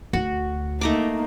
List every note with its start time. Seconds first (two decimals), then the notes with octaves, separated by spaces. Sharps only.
0.13 D2 F#4
0.81 A3 A#3 D#4 A#5 D6